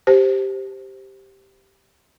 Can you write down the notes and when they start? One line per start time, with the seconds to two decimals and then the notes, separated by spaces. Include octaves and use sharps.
0.07 G4 C5